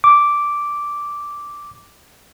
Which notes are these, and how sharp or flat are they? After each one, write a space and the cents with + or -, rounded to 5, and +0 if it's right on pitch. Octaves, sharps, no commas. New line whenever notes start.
D6 -5